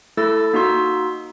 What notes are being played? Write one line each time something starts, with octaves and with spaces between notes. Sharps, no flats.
A3 E4 A4 E6 A6
A#3 D#4 F#4 C6 E6